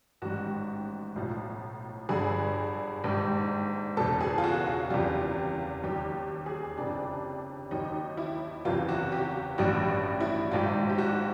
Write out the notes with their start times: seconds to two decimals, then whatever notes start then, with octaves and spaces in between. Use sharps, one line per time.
0.22 A1 G#2 D#3 G3 F#4
1.16 B1 A2 F3
2.09 G1 G2 D3 G#4
3.04 A#1 G#2 D#3 G3
3.97 F#1 E2 B2 A4
4.21 G#4
4.38 F4
4.44 F#4
4.67 F4
4.90 F#1 E2 C3 D#3 G3 F4
5.83 D#2 D#3 G3 G4
6.46 G#4
6.78 F#1 F2 C3 D4
7.71 D#2 D#3 F#3 D#4
8.17 E4
8.65 F#1 E2 C3 E3 F4
8.89 F#4
9.12 G4
9.58 A1 G2 D#3 G3 F#4
10.20 E4
10.52 A#1 G#2 D#3 F#3 F4
10.89 G4
10.98 F#4